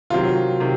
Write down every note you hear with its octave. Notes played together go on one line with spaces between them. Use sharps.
C3 D#3 F#3 C4 F4
C3 D#3